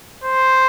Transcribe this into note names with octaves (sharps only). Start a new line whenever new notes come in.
C5